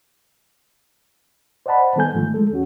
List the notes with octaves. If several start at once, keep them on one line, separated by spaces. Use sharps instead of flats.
C5 D5 D#5 F#5 A5 B5
D#3 G3 B3 A4 G#5 G6
G#2 D3 D#3 F3 A3
G#3 A4
E2 C#4 F#4